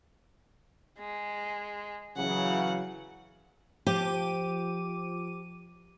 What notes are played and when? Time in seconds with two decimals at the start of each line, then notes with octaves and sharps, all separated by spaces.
0.99 G#3
2.17 C#3 E3 F#3 F#5
3.87 F3 G4 D6 D#7